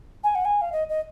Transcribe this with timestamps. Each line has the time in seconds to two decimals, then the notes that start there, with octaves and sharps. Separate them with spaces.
0.24 G#5
0.35 F#5
0.45 G#5
0.61 F5
0.72 D#5
0.89 D#5